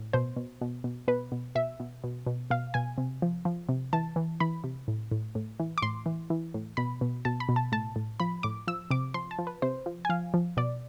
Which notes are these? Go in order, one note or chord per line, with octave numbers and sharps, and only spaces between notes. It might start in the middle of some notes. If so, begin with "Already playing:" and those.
Already playing: A2
B2 C5
B2
B2
B2
B2 B4
B2
B2 E5
B2
B2
B2
B2 F5
B2 G#5
C3
F3
F3
C3
E3 A5
E3
E3 B5
C3
A2
A2
A2
E3
D6
A2 C6
E3
E3
A2
B2 B5
B2
B2 A5
B5
B2
A5
A2 A5
A2
F3 B5
A2 D6
F3 E6
C3 D6
F3 C6
A5
F3
B4
C3 C5
F3
G#5
F3 F5
F3
B2 D5